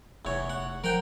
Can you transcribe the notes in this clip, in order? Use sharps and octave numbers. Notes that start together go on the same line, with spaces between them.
F1 E2 C#5
F#5
F3 A#4 F#5 G5